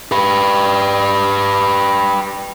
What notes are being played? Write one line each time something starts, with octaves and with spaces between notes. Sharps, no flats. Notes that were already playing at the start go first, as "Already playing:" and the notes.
G4 B4